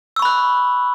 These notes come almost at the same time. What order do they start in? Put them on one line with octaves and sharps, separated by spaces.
E6 C#6 B5 F#6